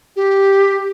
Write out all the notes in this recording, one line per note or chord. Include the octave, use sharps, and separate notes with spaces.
G4